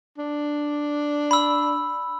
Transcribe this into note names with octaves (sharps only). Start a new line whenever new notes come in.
D4
B5 E6